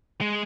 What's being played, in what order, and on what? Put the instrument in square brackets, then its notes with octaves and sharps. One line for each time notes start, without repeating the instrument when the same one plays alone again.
[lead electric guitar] G#3